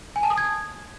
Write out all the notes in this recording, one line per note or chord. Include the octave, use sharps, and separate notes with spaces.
G#5
A5
D#6
G#6